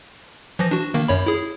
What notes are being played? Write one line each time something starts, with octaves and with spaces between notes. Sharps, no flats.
E3 F3 A#6
D4 F#4
D#3 A#3
F#2 C#5 B5
E4 G#4